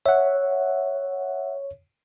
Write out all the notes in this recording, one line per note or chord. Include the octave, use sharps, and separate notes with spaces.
C#5 E5 F#5